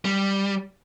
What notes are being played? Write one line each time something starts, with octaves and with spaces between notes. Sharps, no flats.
G3